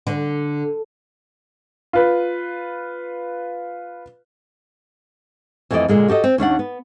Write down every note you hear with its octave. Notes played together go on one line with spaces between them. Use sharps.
D3
F4 B4
F2 E3 A3 F4 D5 D#5
A#2 D3 G#3 A#3
F#4 G4 A4 D#5
C4
D#2 C#4 D4 F#5
B3